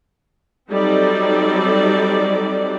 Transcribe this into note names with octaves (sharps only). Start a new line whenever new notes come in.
F#3 G3 C4 D#4 A4 D5